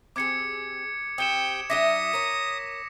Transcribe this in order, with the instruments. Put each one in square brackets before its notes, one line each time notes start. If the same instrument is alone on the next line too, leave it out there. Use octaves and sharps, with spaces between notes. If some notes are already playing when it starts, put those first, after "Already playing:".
[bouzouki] C4 G4 G#4 [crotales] D6 G#6 C#7
[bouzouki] C4 G4 [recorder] G5 [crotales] D#6 C#7 E7
[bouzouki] F#3 D4 E5 [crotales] D6 A#6 B6 [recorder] D#6
[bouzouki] A#4 C#5